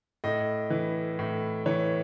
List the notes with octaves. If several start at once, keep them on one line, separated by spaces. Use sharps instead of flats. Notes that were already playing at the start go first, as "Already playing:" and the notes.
A2 D#5
E3
A2
E3 C#5